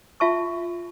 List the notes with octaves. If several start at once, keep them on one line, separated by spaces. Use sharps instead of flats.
F4 E5 A5 C#6